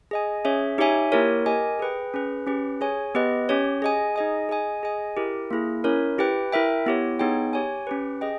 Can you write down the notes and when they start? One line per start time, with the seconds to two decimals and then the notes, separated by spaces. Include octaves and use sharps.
0.11 G#4 D#5 G#5
0.45 C#4 G#4 C#5 E5
0.78 D#4 G4 C#5 E5 G#5
1.12 A#3 E4 G4 A#4 C#5
1.46 G4 A#4 D#5 G#5
1.79 G#4 B4 G5
2.14 C#4 G#4 B4
2.47 C#4 G4 B4
2.81 G#4 C#5 G#5
3.15 B3 G4 B4 D#5
3.49 C#4 G4 C#5
3.82 G#4 D#5 G#5
4.16 D#4 G#4 D#5 G#5
4.49 G#4 D#5 G#5
4.83 G#4 D#5 G#5
5.17 E4 G4 A#4
5.51 A#3 E4 G#4
5.84 C#4 E4 A#4 C#5
6.18 E4 G4 B4 G5
6.52 E4 A#4 E5 G5
6.86 B3 E4 G4 C#5
7.19 B3 D#4 G#4 C#5 G5
7.53 G4 C#5 G#5
7.87 C#4 G4 B4
8.21 G#4 D#5 G5